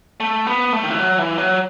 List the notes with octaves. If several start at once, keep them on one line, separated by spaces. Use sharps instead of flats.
A3
B3
A3
D#3
E3
F#3
E3
F#3